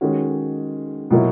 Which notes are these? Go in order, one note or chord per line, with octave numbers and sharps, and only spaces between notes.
D#3 G#3 C#4 F#4
B2 F#3 A#3 E4